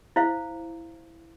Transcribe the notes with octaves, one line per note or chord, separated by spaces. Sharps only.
E4 C5 F5